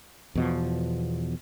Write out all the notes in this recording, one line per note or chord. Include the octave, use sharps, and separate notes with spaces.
E2 B2 F3